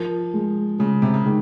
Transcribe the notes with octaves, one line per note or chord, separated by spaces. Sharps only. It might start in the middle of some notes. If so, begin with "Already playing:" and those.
Already playing: F3 A#4
G#3
C#3 G#3
C3
C#3
D#3 G#3